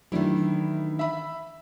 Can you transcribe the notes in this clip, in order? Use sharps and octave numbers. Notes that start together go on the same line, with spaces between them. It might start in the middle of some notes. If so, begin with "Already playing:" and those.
D#3 E3 F#3 A3 D4 E4
E5 B5